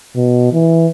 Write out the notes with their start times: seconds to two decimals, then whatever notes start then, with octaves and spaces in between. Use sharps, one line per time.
0.15 B2
0.53 E3